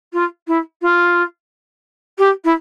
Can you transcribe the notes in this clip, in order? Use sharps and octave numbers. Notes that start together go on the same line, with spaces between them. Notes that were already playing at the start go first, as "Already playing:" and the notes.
F4
E4
F4
G4
E4